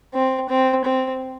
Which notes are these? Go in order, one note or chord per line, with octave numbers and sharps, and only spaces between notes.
C4
C4
C4